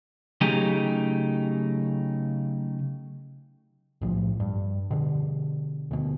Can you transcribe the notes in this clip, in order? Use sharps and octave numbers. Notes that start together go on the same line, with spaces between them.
C#3 F#3 A3 D#4 G4 G#4
B1 A2 F3
G2
B2 D3
D2 B2